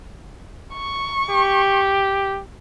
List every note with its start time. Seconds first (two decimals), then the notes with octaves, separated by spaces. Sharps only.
0.74 C#6
1.31 G4